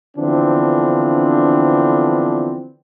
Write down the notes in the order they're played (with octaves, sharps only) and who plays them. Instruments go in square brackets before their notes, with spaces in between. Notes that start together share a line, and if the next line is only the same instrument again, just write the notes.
[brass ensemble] D3 E3 F3 B3 C4 D4